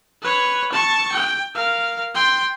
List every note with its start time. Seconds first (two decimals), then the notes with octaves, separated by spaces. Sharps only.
0.22 B4 C#5
0.73 A5 C#6
1.12 G5
1.54 A#4 F5
2.15 G5 C6